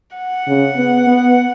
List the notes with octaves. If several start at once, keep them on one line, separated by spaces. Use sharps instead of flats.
F#5
C#3
B3
B3